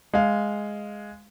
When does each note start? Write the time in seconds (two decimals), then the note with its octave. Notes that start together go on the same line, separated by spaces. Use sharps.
0.13 G#3 F5